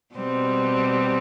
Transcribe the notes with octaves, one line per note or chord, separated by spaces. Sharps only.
B2 G3 C4